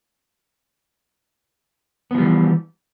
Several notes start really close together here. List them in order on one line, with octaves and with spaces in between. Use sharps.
B3 F3 G3 E3